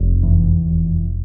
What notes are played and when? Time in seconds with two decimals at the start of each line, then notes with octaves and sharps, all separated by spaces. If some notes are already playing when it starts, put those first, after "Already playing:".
Already playing: F1
0.23 E2
0.69 F1